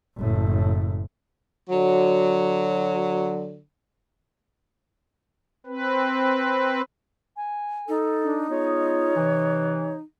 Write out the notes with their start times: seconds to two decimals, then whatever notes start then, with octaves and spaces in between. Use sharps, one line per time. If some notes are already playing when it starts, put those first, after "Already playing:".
0.17 F#1 A2
1.70 D3 F#3
5.66 C4 B4
7.36 G#5
7.89 D#4 A4
8.24 D4
8.50 G#3 B3 F4 C#5
9.16 C3 E3